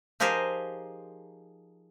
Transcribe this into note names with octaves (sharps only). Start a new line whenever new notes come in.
F3 D#4 G4 G#4 A#4 C5